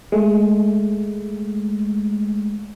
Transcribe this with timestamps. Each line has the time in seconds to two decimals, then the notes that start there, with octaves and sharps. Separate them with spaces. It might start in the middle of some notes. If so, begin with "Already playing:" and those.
0.12 G#3 A3